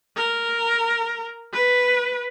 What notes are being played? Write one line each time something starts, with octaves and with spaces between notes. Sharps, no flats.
A#4
B4